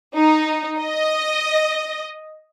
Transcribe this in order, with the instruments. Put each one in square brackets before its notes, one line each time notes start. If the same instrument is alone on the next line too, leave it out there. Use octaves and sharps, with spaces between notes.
[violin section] D#4
D#5